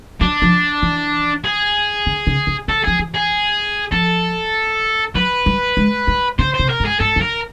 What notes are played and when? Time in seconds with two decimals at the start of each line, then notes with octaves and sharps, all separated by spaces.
0.21 F#3 D4
0.42 F3
0.82 E3
1.44 G#4
2.06 D3
2.27 C#3
2.47 C#3
2.68 D3 A4
2.84 F3 G#4
2.99 E3
3.15 G#4
3.92 F3 A4
5.15 F#3 B4
5.46 G3
5.77 G#3
6.07 G3
6.39 C#3 C5
6.54 C5
6.59 C3
6.69 A#4
6.80 G#2
6.85 G#4
7.00 G#2 A4
7.16 F#2
7.21 A#4